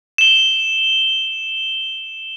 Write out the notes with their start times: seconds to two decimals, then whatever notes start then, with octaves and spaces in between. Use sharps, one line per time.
0.18 E7 G7